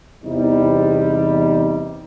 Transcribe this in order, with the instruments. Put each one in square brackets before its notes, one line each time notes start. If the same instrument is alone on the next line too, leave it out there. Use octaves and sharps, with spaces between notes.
[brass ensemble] E2 C3 G3 D#4